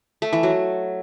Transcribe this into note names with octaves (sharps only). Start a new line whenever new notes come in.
A3
E3
F#3